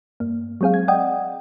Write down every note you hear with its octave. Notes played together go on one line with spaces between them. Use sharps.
G2 A#3
F#3 G#3 C4 G#4 F5
G#6
D5 D#5 F#5 G5 D#6